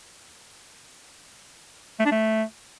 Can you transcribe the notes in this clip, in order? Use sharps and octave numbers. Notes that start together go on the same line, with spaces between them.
A3
D4
A3